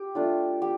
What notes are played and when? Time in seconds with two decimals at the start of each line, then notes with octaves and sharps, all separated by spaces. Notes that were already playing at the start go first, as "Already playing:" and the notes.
Already playing: G4
0.15 A3 D4 F4
0.62 G4